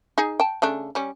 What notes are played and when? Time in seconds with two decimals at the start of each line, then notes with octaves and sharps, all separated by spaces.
0.18 D#4 G#4
0.40 G5 A5
0.62 C#3 A3 D4
0.95 G3 C#4